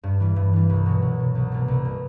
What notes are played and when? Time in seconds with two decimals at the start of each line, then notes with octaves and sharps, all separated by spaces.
0.03 G2
0.20 E3 G3
0.36 G2
0.53 E3 G3
0.69 C2
0.86 B2 F#3
1.02 C2
1.19 B2 F#3
1.35 C2
1.52 B2 G3 A#3
1.68 C2
1.85 B2 G3 A#3